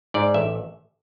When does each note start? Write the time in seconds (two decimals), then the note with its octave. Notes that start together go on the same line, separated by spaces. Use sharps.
0.14 G#2 D5
0.34 A1 E5